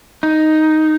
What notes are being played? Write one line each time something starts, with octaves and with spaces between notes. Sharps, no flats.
D#4